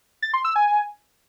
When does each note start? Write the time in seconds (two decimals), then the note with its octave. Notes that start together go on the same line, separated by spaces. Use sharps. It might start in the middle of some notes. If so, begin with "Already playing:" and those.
0.22 A6
0.34 C6
0.45 E6
0.56 G#5